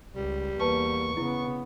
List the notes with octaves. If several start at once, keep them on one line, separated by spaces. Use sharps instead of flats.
C#2 G3
E2 A#3 B4 A5 C#6
C#3 B3 E4